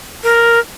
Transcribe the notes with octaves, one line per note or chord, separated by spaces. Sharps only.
A#4